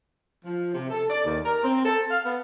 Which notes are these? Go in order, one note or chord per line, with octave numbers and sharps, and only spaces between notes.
F3
C3
A4
D5
D#2
A#4
C4
A4
F5
B3